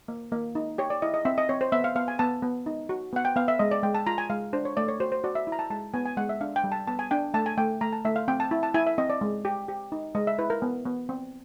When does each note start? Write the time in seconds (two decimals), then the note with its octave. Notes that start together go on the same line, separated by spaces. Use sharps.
0.08 A#3
0.32 A#3
0.55 D#4
0.78 G4 C#5
0.90 D5
1.02 E4 D#5
1.14 D#5
1.25 C4 E5
1.38 D#5
1.49 C4 C#5
1.61 C5
1.72 B3 E5
1.84 F5
1.95 B3 F5
2.08 G#5
2.19 B3 A5
2.42 B3
2.66 D#4
2.89 F#4
3.13 B3 F#5
3.25 G5
3.36 B3 F5
3.48 E5
3.59 G#3 D#5
3.71 D5
3.83 G#3 G5
3.95 A5
4.07 F4 A#5
4.18 G#5
4.30 G#3 F5
4.53 D4 C5
4.65 C#5
4.77 A3 D5
4.88 C#5
5.00 F#4 C5
5.12 C5
5.24 F#4 D5
5.35 E5
5.47 E4
5.52 A#5
5.59 A5
5.70 G#3 A5
5.94 B3 G#5
6.06 G#5
6.17 G#3 F#5
6.29 E5
6.41 D4 F5
6.56 G5
6.64 G3
6.72 A5
6.87 B3 A5
6.99 G#5
7.11 D4 G5
7.34 A3 A5
7.46 G#5
7.58 A3 G5
7.81 A3 A#5
7.93 A5
8.05 A3 E5
8.16 F5
8.28 C4 G5
8.40 A5
8.51 E4
8.63 A5
8.74 E4 G#5
8.87 E5
8.98 C4 D#5
9.10 D5
9.21 G#3
9.45 G4
9.68 G4
9.92 D#4
10.15 G#3 D#5
10.27 E5
10.38 E4 B4
10.50 A#4
10.62 B3
10.86 B3
11.09 C4